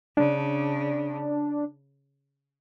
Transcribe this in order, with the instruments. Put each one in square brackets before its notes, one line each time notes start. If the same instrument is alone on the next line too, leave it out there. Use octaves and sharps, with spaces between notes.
[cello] C#3 [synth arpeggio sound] D4